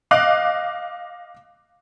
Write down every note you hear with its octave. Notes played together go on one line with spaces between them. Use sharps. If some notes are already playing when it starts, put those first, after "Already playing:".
D#5 F5 D6 F#6